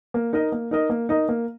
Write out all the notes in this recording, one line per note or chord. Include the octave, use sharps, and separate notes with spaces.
A#3
D#4 A#4 D#5
A#3
D#4 A#4 D#5
A#3
D#4 A#4 D#5
A#3